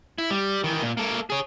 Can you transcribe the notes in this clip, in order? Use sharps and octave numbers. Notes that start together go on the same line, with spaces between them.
E4
G3
D#3 E3
A#2
A#3 A4
G#4 C#5